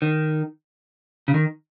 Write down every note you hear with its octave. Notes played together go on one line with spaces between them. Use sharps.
D#3
C#3
D#3